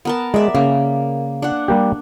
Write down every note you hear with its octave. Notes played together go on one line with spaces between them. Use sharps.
B3 A#4 A5
G#3 D5 E5
C#3 A#3
D4 F#5
G3 A#3 G4